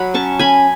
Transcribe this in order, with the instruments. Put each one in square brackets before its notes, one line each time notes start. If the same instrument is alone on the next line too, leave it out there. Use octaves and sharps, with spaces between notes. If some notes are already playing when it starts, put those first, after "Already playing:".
Already playing: [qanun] F#3 F#5 B5
C#4 A5 C#6
C#4 G#5 B5